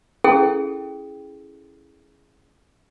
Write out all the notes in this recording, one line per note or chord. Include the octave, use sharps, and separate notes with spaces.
C#4 E4 G#4 A4 G5